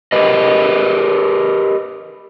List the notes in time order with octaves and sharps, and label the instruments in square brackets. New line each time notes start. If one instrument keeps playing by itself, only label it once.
[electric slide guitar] G4 A#4 B4 D#5